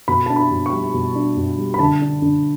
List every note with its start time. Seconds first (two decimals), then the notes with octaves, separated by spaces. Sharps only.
0.08 B2 B5
0.26 D4 A5
0.36 B5
0.51 B2
0.66 C#6
0.72 G3
0.94 B2
1.15 D4
1.37 B2
1.58 G3
1.74 B5
1.79 D3 A5
2.02 D4
2.22 D3